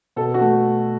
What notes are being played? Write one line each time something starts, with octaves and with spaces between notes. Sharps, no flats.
B2 A4
F#4
A3